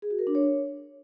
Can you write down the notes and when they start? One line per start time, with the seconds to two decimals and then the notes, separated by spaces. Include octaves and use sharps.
0.02 G#4
0.10 F#4
0.19 A#4
0.27 D4
0.35 C#5